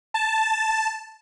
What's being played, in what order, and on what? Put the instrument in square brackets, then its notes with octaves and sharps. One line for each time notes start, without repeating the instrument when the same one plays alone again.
[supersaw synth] A5